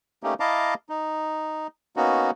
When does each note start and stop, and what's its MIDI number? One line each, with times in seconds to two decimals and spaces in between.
0.23 0.34 57
0.23 0.34 58
0.23 0.34 61
0.23 0.34 63
0.23 0.34 67
0.40 0.74 64
0.40 0.74 75
0.40 0.74 77
0.40 0.74 81
0.40 0.74 82
0.40 0.74 86
0.89 1.67 63
1.97 2.31 58
1.97 2.31 59
1.97 2.31 61
1.97 2.31 63
1.97 2.31 66